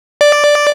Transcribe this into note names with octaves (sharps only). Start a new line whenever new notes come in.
D5